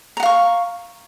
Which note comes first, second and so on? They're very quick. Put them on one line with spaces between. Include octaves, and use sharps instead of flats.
A#5 F#5 F5 C#6